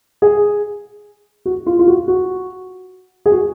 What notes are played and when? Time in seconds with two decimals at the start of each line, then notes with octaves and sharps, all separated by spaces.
0.22 G#4
1.46 F#4
1.67 F4
1.79 F4
1.87 F#4
2.08 F#4
3.26 G#4
3.32 F#4